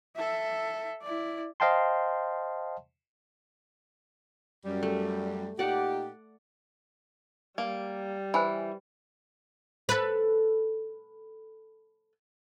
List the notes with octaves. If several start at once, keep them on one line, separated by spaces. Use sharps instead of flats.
A4 E5
E4 D5
C5 D#5 F5 G5 A5 C6
F#2 G3
A3
A#2 D#4 G4 D5 F#5
G3 A#3
E3 C5 G#5 B5
A4 B4